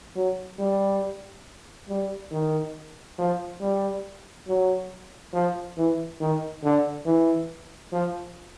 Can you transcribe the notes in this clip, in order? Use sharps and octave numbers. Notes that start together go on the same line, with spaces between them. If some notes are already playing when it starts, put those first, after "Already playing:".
F#3
G3
G3
D#3
F3
G3
F#3
F3
E3
D#3
D3
E3
F3